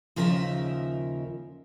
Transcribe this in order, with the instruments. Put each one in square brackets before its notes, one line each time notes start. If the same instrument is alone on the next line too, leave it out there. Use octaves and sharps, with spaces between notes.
[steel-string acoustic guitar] D#2 C#3 F3 A#4 D#5 E5